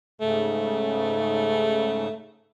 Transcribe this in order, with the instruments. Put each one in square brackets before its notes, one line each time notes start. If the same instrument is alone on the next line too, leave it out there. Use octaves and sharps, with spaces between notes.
[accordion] G#2 C#3 [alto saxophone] A3